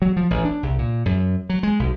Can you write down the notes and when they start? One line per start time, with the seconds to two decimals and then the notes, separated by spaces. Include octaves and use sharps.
0.02 F#3
0.17 F3
0.31 A1
0.45 D4
0.63 C2
0.79 A#2
1.06 F#2
1.50 F#3
1.63 G#3
1.79 B1